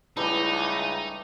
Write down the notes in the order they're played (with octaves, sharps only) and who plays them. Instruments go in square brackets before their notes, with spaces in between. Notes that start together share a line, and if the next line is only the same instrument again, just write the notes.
[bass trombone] C#2 [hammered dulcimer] E3 G3 A3 [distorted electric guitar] D#4